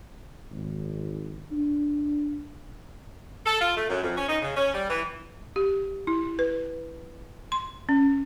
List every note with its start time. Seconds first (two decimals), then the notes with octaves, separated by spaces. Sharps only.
0.51 G#1
1.51 D4
3.46 A4
3.60 F4
3.77 A3
3.89 F#2
4.02 F2
4.17 C#4
4.29 D#4
4.42 C#3
4.56 C#4
4.74 G3
4.90 E3
5.56 G4
6.07 E4
6.39 B4
7.52 C6
7.89 C#4